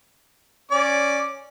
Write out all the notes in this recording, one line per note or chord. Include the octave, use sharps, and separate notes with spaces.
C#4 D5 D6